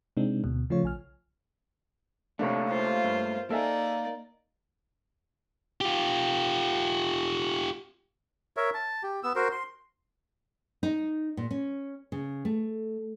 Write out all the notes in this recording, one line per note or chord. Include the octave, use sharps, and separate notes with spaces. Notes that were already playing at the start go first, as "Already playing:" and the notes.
C3 G#3 C4 D4 D#4
D2 B2
C#3 F3 A3 F4 C#5
B1 G#5 F6
C3 A3 A#3 D4 C#5
F4 C5
G2
A#3 D#4 A4 D5 E5 G#5
F4 G4
A#4 C#5 E5
A5
G4
B3 E6
F#4 A#4 C5
C6
D#4
A#2
C#4
C#3
A3